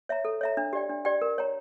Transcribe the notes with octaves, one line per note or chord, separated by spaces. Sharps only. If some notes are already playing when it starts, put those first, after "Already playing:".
C#5 E5 A#5
A4
C#5 E5 A#5
D4
G4 D5 G5
D4
G4 D5 G5
A#4
C#5 G5 A#5